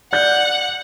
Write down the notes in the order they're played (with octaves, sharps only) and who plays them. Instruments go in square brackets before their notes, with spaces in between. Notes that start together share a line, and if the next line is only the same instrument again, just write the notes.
[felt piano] D5 F#6 G6 [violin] F#5